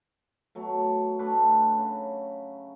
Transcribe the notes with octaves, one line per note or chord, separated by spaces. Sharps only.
B2 F#3 A3
A3 D4 B4
C#3